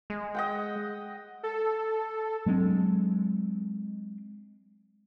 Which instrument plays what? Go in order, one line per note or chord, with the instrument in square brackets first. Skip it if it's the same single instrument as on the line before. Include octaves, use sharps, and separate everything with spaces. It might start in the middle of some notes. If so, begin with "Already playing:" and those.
[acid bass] G#3
[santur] D#5 F#5 G5
[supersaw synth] A4
[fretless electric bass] F#3 G#3 C4 D4